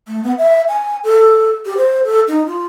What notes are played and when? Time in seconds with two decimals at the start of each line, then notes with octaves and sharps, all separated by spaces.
0.08 A3
0.23 B3
0.38 E5
0.69 G#5
1.04 A4
1.66 G4
1.77 C5
2.04 A4
2.28 D#4
2.46 F4